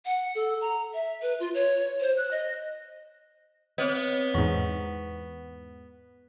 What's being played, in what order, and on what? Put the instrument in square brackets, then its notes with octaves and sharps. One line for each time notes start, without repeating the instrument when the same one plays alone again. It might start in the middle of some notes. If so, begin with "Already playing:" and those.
[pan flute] F#5
A4
A#5
E5
B4
F4
C#5
C5
F#6
D#5
[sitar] B3 [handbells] C4 C#5 D#5
[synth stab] E2 G#2 [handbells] F#5 C#6